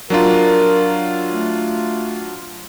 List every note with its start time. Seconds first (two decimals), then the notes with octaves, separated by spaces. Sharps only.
0.10 F#3 D4 F4 A#4
1.30 A3